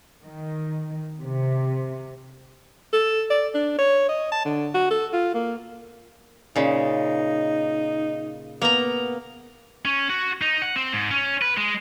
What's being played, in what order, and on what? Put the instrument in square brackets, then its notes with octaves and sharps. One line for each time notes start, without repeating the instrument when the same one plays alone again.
[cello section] D#3
C3
[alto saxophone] A4
D5
D4
C#5
D#5
A5
D3
F#4
A4
F4
A#3
[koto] A#2 C#3 [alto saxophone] D#4
[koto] A#3 A#5 [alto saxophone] B3
[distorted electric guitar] C#4
F#4
D#4
F#5
C4
G#2
C#4
B4
G#3